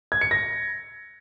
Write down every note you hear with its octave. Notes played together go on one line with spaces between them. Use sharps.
G#6
C#7
A#6